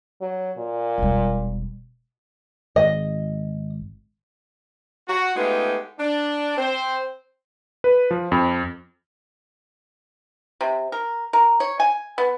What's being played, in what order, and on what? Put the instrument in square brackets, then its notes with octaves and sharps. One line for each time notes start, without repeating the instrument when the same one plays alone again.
[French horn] F#3
A#2
[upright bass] E1 G3
[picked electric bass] G#1 [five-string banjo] D#5
[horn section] F#4
G#3 A3 B3 D#4 F4 G4
D4
C4 C5
[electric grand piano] B4
F3
F2
[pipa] C3
A#4
A#4
C#5
G#5
B3